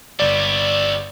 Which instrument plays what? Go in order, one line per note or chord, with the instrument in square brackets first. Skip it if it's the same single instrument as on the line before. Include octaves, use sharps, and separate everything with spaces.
[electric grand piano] G1 D5 [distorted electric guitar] G3 E4